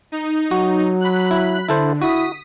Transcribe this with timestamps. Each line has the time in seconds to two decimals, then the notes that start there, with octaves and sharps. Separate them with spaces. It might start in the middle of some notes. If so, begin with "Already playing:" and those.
0.12 D#4
0.51 F#3 F#4
1.00 B5 F#6
1.31 E4
1.69 D3 E4 A4 C5
2.02 E4 F#4 D#6 B6